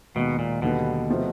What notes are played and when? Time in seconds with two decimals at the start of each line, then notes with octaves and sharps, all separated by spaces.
0.15 D#2 B2 D#3 G#3
0.39 A#2
0.62 D#2 B2 D3 G3 B3
1.10 C3 F3 A3